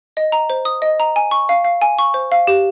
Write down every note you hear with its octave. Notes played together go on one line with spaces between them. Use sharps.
D#5
A#5
C5
D#6
D#5
A#5
G#5
C#6
F5
F5
G#5
C#6
C5
F5
G4